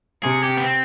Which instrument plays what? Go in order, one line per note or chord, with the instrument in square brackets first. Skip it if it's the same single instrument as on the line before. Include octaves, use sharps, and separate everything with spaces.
[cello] C3 [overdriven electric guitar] G#4
[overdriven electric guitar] G4
B3
C4